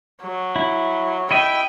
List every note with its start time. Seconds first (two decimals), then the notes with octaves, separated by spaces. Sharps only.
0.22 F#3
0.56 E4
1.31 E4 D#5 E5 G5